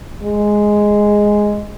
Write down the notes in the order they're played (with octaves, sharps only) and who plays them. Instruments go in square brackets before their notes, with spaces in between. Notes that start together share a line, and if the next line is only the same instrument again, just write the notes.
[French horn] G#3